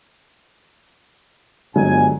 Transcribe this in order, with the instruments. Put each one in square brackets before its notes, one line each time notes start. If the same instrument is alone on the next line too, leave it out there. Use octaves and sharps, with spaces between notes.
[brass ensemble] G1 G#5 [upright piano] D3 F#3 G#3